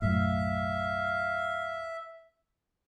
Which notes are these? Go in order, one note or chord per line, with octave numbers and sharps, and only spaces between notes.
B1 F#2 A2 E5 F5